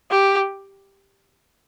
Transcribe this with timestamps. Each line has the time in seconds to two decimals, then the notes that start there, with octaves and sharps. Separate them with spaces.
0.11 G4